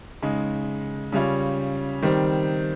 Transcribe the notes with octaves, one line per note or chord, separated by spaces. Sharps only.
C#3 G#3 D#4
C#3 G3 C#4 F4
D#3 G3 C4